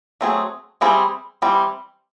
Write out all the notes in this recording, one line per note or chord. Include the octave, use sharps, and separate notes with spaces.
F#3 A3 C4 F4 G#4
E3 G3 C4 E4 G#4
E3 G3 C4